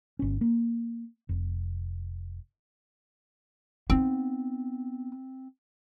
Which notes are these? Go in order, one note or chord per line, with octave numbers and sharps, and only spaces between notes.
G1 C#4
A#3
F1
B3 C4 D#4